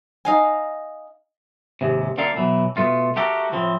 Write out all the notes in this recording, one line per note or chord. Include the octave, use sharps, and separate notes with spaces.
D#4 F5 G#5
D#2 G#2 C3
D2 D3 A#3 A4 F5
B2 E3 F#3
B2 A3 F4
A3 F#4 G4 A4 A#4
A2 F3 C4